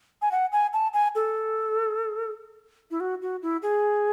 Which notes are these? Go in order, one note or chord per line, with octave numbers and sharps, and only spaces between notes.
G#5
F#5
G#5
A5
G#5
A4
E4
F#4
F#4
E4
G#4